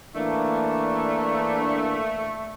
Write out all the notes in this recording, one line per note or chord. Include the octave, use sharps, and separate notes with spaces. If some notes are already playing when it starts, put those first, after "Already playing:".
E3 A3 A#3 D4